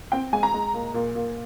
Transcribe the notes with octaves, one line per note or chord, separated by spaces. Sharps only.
C4 G5
G#3 G#5
A#5
G#3
A#2
A#2
A#2